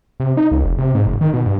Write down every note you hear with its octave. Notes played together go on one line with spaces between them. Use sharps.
C3
D#4
C#2
F1
C3
G#2
F#1
D#3
B2
G2